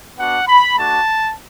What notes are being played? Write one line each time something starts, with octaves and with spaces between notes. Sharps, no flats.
B3 D4 F#4 F#5
B5
A3 D4 F#4 A5